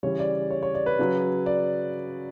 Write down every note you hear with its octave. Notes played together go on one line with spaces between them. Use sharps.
C#3 E3 G3 C#5
D5
C#5
C#5
D5
B4
C#3 F#3
D5